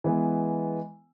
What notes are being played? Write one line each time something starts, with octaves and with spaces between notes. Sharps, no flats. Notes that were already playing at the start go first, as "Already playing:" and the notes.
E3 G#3 B3